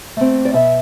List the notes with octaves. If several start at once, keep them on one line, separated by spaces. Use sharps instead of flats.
A3 C4
D5
B2 E5